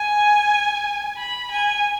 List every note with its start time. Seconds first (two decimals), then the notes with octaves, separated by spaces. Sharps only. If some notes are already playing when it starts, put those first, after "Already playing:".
Already playing: G#5
1.17 B5
1.51 G#5